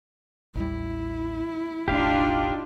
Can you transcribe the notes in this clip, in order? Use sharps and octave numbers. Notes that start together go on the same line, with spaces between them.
A1 D#2 G3 E4
E1 A1 A3 D4 D#4 F4 G4 F5